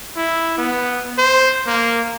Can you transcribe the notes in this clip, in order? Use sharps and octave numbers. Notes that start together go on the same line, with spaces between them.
E4
B3
C5
A#3